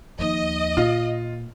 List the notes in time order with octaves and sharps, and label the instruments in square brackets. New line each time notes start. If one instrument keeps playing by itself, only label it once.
[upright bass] D#2 F3 [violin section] D#5
[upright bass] A#2 [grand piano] F4